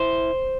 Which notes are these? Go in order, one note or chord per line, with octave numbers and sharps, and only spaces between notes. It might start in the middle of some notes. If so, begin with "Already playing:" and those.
Already playing: E4 C5